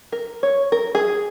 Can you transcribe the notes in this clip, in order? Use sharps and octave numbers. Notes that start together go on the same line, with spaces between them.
A#4
C#5
A#4
G#4